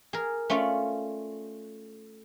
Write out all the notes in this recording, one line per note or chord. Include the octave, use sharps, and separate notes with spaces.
G#4 A#4
A3 C#4 F4 D5